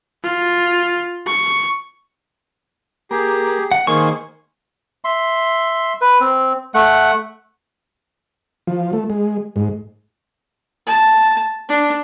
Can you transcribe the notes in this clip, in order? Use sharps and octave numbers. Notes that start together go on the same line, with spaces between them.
F4
C#6
A#3 G4 G#4
F#5
D#3 A#3 G#4 C5 C#6
E5 C6
B4
C4
A3 F#5
F3
A3
G#3
G#2
A5
D4